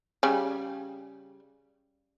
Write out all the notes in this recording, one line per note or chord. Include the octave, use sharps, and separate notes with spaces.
C#3 G3 G#5